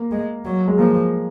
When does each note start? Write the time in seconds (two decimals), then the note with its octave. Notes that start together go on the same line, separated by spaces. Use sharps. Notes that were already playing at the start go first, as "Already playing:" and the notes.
Already playing: A#3
0.11 G#3
0.44 F#3
0.68 G#3
0.78 F3 A#3